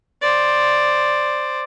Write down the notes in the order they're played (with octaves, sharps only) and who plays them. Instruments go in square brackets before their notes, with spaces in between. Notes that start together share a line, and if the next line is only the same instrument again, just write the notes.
[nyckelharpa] C5 D5